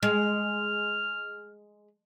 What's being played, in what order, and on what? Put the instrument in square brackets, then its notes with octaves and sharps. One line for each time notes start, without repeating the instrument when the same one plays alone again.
[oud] G#3 [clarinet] F6